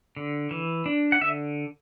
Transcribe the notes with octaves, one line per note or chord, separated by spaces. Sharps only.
D3
E3
D4
F#5
D3 E5